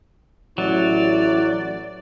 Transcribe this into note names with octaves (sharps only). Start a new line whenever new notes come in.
A1 F#3 E4 D5